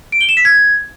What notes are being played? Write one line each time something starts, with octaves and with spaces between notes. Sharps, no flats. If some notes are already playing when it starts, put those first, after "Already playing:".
D7
G7
E7
B6
G#6